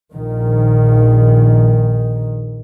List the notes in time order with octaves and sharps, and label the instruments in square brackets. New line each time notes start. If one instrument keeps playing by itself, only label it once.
[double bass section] A#1 D#3